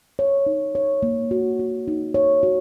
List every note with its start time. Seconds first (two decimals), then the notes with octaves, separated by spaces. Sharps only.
0.19 C#5
0.46 D#4
0.75 C#5
1.03 A#3
1.31 F#4
1.60 F#4
1.88 D#4
2.14 C#5
2.43 F#4